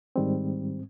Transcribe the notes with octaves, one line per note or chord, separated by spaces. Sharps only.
G#2 D#3 G3 C4